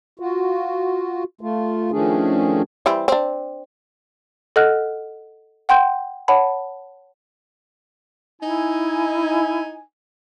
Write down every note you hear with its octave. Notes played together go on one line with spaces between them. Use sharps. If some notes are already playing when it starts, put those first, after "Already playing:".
F4 F#4
A3 F4
D#3 F3 A3 C#4 D4 G#4
E3 G3 C4
C4 D4
A4 D#5 F#5 F6 F#6
F#5 G5 C6 G6
C#5 F#5 A5 B5
D#4 E4 G#5